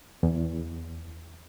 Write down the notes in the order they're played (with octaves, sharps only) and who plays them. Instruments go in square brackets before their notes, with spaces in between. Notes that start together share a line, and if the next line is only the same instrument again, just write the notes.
[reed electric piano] E2